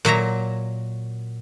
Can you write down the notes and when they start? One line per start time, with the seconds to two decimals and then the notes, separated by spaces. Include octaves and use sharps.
0.05 A#2 F#3 E5 A#5